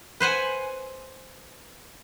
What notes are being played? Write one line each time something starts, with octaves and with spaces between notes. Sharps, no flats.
B4 C5 F#5 G#5